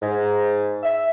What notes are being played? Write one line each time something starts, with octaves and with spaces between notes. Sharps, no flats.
G#2
E5